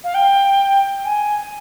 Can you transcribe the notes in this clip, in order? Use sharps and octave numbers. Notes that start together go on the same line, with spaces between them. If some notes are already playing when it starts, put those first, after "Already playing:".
F5
G5
G#5